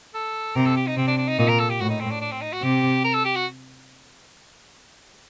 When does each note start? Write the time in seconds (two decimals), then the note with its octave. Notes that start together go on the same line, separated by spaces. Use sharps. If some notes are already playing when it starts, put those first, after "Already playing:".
0.14 A4
0.56 C3 A#4
0.66 A4
0.77 G4
0.87 D#4
0.97 C3 C4
1.07 D4
1.18 D4
1.28 D#4
1.39 A#2 D#4
1.48 A#4
1.59 A4
1.70 G4
1.80 A2 F#4
1.90 D#4
2.00 C4
2.11 D4
2.21 D4
2.32 C4
2.42 D#4
2.52 F#4
2.63 C3 G4
3.04 A#4
3.14 A4
3.25 G4
3.35 F#4